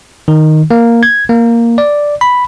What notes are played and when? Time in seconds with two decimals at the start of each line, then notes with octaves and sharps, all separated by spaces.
0.28 D#3
0.71 A#3
1.03 G#6
1.29 A#3
1.78 D5
2.21 B5